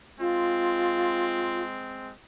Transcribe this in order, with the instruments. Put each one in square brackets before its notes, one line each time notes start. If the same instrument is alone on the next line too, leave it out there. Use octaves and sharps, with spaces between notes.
[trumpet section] G#3 C4 [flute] F4